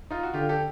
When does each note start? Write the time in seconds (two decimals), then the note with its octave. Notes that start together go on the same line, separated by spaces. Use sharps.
0.11 D#4 F4
0.23 F#4
0.34 D3 F4 G4
0.49 G4 A4